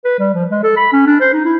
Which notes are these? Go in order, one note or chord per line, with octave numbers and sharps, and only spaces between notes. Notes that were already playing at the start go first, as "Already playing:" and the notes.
B4
G3
F3
G#3
A4
B5
C#4
D4
C5
D#4
E4